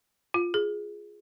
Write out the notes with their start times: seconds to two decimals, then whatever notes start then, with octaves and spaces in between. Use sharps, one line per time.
0.34 F4
0.54 G#4